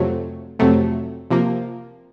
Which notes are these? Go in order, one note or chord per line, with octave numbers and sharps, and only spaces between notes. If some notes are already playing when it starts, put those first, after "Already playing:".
Already playing: F2 C3 F#3 A3
F2 C3 F#3 A3
C3 F3 A#3